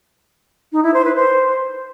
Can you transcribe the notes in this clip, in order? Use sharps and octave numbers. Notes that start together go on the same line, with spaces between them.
D#4
E4
C5
B4
C5